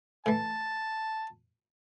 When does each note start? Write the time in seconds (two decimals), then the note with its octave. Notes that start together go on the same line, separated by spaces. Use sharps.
0.26 A2 E3 A5